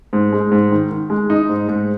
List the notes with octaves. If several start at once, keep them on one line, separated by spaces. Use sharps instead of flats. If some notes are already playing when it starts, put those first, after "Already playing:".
G#2
G#3
G#2
D#3
D#3
G#3
D#4
G#2
G#2